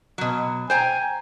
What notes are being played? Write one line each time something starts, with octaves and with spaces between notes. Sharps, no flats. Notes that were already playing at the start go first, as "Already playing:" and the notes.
B2 F#3
C5 G5 G#5 A#5